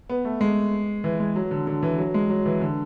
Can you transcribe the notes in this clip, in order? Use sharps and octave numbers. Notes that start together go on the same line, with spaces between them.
B3
A3
G#3
E3
G#3
F#3
D3
D3
E3
F#3
G#3
F#3
E3
D3